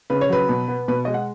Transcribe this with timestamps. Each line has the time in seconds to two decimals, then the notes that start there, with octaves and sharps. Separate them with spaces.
0.10 C#3 B4
0.21 C#5
0.29 F#3 B4
0.49 B2
0.68 B3
0.88 B2 B4
1.05 G#3 D#5
1.14 F#5